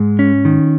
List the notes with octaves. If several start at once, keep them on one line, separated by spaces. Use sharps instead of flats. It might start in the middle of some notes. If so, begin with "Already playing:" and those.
Already playing: G#2 G#3
C#4
D#3